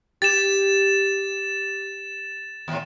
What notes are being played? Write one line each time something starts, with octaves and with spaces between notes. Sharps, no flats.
G4 A6 E7
D#2 A2